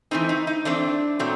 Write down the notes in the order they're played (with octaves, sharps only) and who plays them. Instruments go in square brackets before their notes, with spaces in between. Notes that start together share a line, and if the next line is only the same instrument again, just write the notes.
[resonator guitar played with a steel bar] E3 A3 C4 D#4
D#4
D#4
E3 A3 C4 D4
A#2 F#3 A3 C4